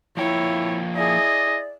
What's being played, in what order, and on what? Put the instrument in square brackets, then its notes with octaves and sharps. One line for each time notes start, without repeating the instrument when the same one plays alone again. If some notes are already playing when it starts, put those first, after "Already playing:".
[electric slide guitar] F3 A#3 G5 [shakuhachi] E4 [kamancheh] C#5
[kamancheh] E4 G#4 [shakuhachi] D5 [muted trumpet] D#5